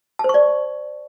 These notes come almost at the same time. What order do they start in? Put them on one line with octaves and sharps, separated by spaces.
A5 C5 C#6 D5